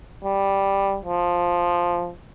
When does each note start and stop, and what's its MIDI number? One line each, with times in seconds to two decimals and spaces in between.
0.25 0.98 55
1.05 2.12 53